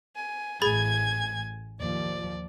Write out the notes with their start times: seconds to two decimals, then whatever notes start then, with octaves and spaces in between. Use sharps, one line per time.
0.16 G#5
0.62 A1 A2 G#4 G#5 B5 G#6 A6
1.80 D#2 F3 D5